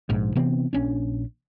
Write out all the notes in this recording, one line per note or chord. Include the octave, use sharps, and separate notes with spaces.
A#1 G#2
C3 E3 B3 C4
A#1 C#4 D4